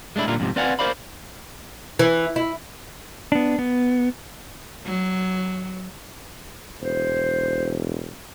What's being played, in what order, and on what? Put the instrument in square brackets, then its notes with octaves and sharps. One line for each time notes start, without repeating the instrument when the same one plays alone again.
[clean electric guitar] G#3 A3 D4 E4
A#2 D3 G3 F4 A#4
F2 G#2 C3
C4 B4 D5 F5 F#5 G#5
A#4 C5 D5 F5 B5
[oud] E3
E4
[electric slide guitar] B3 D4
B3
[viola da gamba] F#3
[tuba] E1 [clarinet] C5